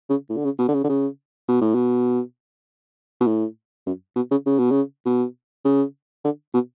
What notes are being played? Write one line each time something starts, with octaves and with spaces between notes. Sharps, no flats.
C#3
A2
D3
C#3
B2
D3
C#3
D3
C#3
B2
A2
B2
B2
A2
F#2
B2
C#3
C#3
B2
C#3
B2
C#3
D3
B2